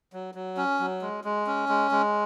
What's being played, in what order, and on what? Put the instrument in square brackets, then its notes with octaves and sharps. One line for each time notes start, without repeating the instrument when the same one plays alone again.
[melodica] F#3
F#3
C#4
F#3
G#3
G#3
C#4
G#3
G#3